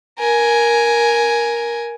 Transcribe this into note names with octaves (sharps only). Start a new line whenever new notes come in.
A#4 G#5